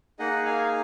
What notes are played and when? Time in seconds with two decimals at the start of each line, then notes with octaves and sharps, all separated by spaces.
0.19 A#3 D#4 G#4 D#5 F#5
0.45 F5 G#5